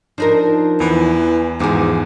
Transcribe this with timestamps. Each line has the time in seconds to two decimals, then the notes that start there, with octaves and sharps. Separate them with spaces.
0.18 F3 D4 D#4 A#4
0.80 E2 E3
1.60 E2 G#2 F3 G#4 D6